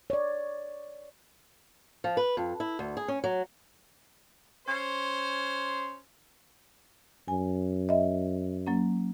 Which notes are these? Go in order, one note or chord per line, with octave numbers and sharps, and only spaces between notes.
C#5 D5
F3
B4
F2
E4
D2
G#4
C#4
F#3
C#4 C5
F#2 G#5
D#5 E5
F#3 A#3 C#4